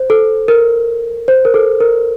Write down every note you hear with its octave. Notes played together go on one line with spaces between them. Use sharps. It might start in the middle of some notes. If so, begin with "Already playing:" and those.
Already playing: C5
A4
A#4
C5
A#4
A4
A#4